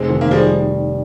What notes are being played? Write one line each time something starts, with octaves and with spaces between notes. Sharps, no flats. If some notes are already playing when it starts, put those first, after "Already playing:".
Already playing: F1 G#3 C4
D#3
A#3
F3 G3 G#3